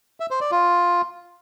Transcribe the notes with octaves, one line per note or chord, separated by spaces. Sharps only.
E5
C5
D5
F4